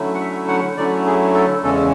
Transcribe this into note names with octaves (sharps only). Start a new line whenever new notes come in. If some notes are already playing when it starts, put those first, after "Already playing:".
Already playing: D3 F#3 A3 C#4 E4
F#5
E5
F#5
D3 F#3 A3 C#4 E4 D5
G#4
A4
E2 C#3 G#3 C#4 A4